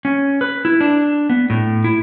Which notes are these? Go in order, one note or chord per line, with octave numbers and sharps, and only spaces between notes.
C#4
B4
E4
D4
B3
A2
E4